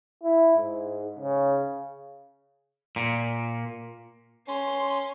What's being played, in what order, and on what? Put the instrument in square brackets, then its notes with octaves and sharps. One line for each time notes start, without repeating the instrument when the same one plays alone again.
[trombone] E4
G#2
C#3
[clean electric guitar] A#2
[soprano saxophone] C#4 [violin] C6